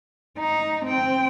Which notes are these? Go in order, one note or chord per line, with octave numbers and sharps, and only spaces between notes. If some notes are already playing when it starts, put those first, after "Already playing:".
D#4
C4 G5